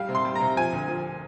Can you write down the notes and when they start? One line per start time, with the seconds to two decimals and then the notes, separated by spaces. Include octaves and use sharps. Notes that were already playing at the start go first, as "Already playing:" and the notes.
Already playing: G3 F5
0.09 C3
0.15 C6
0.25 G3
0.35 C3 A#5
0.56 F3 G#5
0.73 D2
0.88 F3